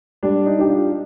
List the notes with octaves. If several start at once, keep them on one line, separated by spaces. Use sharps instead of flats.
G3 D4
D#4
D4 G4
F4